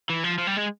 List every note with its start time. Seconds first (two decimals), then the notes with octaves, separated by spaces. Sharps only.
0.10 E3
0.24 F3
0.38 F3
0.47 G3
0.57 G#3